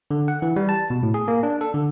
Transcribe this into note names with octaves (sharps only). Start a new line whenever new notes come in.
D3
F#5
E3
G3
A5
B2
A2
G#4
A#3
D4
A4
D3